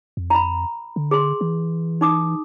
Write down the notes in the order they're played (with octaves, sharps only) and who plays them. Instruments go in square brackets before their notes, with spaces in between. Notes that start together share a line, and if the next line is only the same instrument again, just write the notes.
[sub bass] F2
[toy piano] A#5 B5
[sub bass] D3
[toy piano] G#4 C6
[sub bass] E3
[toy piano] D#4 D6 D#6